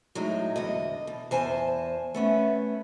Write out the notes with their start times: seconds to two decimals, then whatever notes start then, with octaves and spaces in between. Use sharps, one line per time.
0.15 A2 F#3 G#3 D#4
0.56 E2 D3 D#5
1.07 B2
1.31 E2 C5 G#5 A5
2.14 A3 B3 C#4